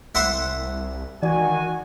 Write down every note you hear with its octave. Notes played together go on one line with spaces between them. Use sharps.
C2 E5 F#5 C6
D#3 E3 F#4 D5 G#5